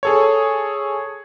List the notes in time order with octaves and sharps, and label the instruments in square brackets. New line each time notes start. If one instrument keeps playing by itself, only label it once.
[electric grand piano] G#4 A4 C#5